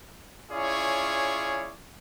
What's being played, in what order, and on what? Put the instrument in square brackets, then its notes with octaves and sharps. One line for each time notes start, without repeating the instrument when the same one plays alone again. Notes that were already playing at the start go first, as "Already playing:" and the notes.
[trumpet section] C#4 E4 F4 G#4 C#5 D5